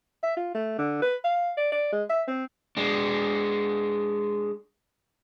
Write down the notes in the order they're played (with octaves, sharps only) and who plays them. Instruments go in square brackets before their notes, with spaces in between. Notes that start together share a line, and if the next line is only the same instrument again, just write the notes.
[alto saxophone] E5
F4
A3
D3
B4
F5
D5
D5
G#3
E5
C4
[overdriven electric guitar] G#3 D4